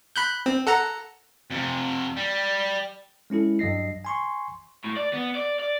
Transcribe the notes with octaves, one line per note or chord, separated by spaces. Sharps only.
B5 F#6 G6
C4
A4 F#5 A#5
F2 C3
G3
G#3 C#4 E4 A4
G2 F#3 D#5 A#6 C7
G#5 C6 C#6
A2
D5
B3
D5
D5